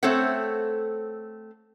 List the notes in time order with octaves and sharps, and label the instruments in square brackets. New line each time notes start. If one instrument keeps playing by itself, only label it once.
[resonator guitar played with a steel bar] A3 C4 A4 C5 C#5 F#5